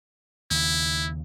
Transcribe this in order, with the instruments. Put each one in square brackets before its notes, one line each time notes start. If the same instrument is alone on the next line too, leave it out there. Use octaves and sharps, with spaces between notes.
[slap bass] D#2 C#3 [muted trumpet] E4